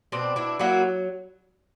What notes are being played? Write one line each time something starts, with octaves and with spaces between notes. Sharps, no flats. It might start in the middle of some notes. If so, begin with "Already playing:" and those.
B2 C4 D4
D4 E4
F#3 A#3 E4 F#4